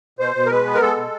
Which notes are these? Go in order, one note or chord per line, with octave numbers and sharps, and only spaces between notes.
B2 C5
B2
A#4
G#3 B4
B3
A#4
G#3 A4
B2